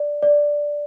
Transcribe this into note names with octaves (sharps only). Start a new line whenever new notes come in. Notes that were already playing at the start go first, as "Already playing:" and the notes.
Already playing: D5
D5